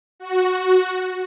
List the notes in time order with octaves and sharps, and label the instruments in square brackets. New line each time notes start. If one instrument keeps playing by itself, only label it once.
[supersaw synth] F#4